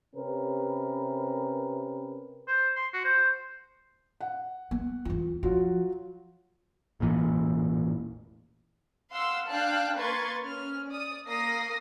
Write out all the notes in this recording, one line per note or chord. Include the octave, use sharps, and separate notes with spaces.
C3 C#4 G4 A#4 B4
C5
C6
F#4
C5
F#5
B3
E2 F4
F3 F#3 F4 F#4
E1 A1 A#2 E3
F5 F#5 C6 E6
D4 F5 G5 A5 F#6
A#3 B4 C6 C#6 G#6 A6
C#4 F6
D5 D#6
A#3 D#6 A#6 C7